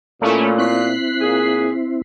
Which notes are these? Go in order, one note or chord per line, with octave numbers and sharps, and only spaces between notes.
A#2 A3 C#4 E4
C4 E4 F#6 B6 C7
A#2 G#4